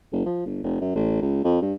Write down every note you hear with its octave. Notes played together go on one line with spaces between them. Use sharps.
F#1
F3
G1
F1
F#2
A1
C#2
F2
G2